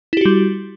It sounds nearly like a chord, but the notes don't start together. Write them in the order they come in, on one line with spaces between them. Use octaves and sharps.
E4 G4 F#4 G3